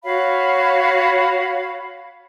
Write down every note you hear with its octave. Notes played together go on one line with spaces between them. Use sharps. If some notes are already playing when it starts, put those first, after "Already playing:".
F#4 C#5 F5 B5